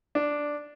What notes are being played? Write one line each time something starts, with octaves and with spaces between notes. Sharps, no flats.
D4